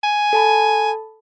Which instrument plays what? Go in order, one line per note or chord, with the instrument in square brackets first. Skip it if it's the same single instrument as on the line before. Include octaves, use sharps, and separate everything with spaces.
[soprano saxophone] G#5
[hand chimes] A4 A5 B5